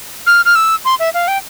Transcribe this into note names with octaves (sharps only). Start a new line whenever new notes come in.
F6
F6
E6
C6
E5
F5
G5